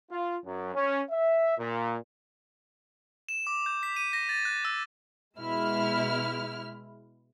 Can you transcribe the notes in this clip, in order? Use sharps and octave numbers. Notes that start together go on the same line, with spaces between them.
F4
F#2
C#4
E5
A#2
E7
D6
G6
B6
D#7
A#6
A6
F#6
E6
B2 G#3 E4 F6